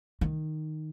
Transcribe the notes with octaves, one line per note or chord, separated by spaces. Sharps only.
D#3